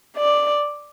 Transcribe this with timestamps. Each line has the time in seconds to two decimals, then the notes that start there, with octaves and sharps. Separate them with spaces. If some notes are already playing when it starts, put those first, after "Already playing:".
0.17 D5